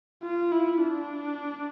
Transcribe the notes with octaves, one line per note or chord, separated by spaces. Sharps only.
F4
E4
D4